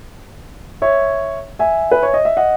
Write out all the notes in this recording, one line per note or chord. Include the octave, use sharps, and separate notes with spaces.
C#5 E5
E5 G#5
B4
C#5
D#5
E5
D#5 F#5